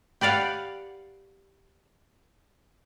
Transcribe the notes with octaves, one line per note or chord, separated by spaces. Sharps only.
G4 B4 D5 F5 F#5